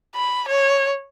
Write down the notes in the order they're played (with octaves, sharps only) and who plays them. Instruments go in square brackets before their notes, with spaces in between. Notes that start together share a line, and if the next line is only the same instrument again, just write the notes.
[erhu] B5
C#5